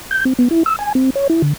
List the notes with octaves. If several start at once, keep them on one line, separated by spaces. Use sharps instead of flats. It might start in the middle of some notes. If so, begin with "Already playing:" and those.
G6
C4
B3
E4
E6
G#5
C4
C#5
E4
D3